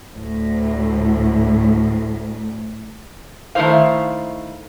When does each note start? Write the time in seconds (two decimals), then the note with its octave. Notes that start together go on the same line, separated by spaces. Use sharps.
0.15 D2 A2
3.55 D#3 A3 C#4 E4 C5 F5